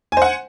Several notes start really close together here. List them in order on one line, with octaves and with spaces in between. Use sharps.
G#5 C5 F#5